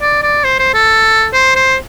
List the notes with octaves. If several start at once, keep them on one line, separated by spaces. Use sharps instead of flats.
D5
D5
C5
C5
A4
C5
C5